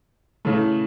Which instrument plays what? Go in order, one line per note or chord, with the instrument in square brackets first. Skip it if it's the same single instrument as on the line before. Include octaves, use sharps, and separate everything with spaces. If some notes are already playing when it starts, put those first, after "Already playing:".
[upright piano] C#3 E3 A3